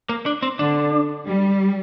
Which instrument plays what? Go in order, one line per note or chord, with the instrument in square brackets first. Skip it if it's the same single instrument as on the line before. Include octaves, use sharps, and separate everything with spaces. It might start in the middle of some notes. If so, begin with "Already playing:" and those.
[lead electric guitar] A#3
D4
C4
[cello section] D3 [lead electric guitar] D4
[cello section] G3